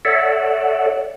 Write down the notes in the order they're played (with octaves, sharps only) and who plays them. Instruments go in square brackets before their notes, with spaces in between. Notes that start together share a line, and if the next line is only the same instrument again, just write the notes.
[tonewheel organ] A4 C#5 D5 E5 F#5